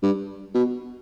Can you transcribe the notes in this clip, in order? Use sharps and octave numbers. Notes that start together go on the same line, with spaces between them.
G2
B2